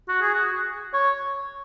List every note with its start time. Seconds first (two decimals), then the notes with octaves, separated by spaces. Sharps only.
0.09 F#4
0.22 G#4
0.34 F#4
0.94 C#5